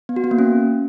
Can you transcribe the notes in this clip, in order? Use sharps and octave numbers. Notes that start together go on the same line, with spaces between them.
B3
F#4
B3
A#3
C#4